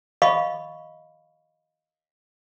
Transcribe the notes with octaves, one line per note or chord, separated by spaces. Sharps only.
D#5 F5 B5 C#6